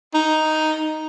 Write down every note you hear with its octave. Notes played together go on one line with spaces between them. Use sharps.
D#4